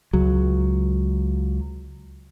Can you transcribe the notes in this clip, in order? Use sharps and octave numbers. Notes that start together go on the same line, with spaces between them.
C#2 F#3